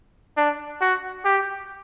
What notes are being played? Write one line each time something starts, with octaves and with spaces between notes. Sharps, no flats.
D4
F#4
G4